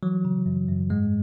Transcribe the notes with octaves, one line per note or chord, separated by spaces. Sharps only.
E3 F#3
C#3
F#2
F#2
G#2 G#3